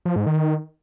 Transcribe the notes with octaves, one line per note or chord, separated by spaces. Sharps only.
F3
G#2
D#3